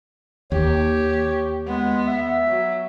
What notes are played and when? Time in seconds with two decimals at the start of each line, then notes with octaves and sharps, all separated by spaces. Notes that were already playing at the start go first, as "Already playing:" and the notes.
0.52 D#2 G4 C#5
1.67 G#3 B3
2.08 E5
2.47 F#3